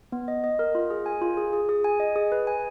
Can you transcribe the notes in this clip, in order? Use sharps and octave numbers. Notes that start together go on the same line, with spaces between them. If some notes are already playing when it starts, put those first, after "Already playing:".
B3
D#5
D#5
A#4
F4
G#4
G#5
F4
G#4
G#4
G#4
G#5
D#5
G#4
B4
G#5